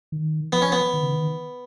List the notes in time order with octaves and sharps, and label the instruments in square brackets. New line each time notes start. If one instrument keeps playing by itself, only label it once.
[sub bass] D#3
[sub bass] F3 [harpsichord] B3
[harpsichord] C#4
B3
[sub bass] D#3
C#3
D#3